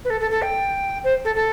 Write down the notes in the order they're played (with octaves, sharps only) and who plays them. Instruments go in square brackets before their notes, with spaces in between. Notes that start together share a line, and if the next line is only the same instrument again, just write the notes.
[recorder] B4
A4
A4
A4
G5
C5
A4
A4